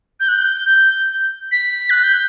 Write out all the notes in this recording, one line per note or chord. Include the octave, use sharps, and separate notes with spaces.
G6
F#6
G6
B6
F#6
G6